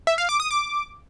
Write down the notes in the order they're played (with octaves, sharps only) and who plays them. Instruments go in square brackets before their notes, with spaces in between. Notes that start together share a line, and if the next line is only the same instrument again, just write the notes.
[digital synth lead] E5
F5
D6
D#6
D6